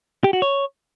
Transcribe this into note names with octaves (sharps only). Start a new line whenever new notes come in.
G4
F#4
C#5